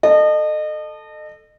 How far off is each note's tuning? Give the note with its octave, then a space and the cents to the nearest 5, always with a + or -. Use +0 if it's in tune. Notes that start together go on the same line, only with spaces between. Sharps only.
A4 +0 D#5 -30